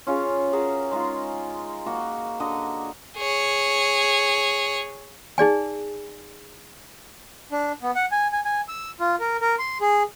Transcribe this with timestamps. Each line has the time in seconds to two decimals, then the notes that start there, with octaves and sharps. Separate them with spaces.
0.07 C#4 F4 G#4 C#5
0.53 F#4 G#4 A#4 A5
0.91 G#3 D#4 F4
1.86 A#3 F#4
2.40 D3 F#4 D#5 A#5
3.17 G#4 C#5
5.38 D#4 G#4 D5 G#5
7.52 D4
7.82 B3
7.95 F#5
8.12 G#5
8.32 G#5
8.45 G#5
8.68 E6
9.00 F4
9.20 A#4
9.41 A#4
9.59 C6
9.81 G#4